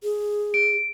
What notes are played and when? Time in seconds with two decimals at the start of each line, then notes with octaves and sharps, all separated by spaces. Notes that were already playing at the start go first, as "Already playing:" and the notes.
0.03 G#4
0.54 D7